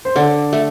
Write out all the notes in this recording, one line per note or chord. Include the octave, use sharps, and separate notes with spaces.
C5
D3 D5
A3